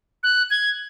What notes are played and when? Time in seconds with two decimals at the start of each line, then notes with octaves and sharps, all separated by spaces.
0.23 F#6
0.50 G#6